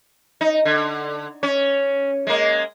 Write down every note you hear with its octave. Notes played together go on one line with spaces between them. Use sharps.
D#4
D3
C#4
G#3 A#3